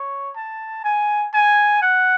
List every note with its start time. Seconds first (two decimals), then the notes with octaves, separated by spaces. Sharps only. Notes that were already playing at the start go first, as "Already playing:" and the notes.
Already playing: C#5
0.36 A5
0.84 G#5
1.34 G#5
1.82 F#5